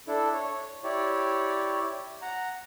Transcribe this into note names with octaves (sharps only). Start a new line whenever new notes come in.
D4 E4 A4
C#5
E4 G4 C#5 D5
F#5 A#5